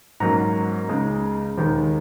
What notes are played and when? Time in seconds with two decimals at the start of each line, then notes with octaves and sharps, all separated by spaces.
0.20 G#2 F#3 A#3 C#4 A#5
0.88 C#2 C#3 G#3 D#4
1.58 D#2 D#3 G#3 D#4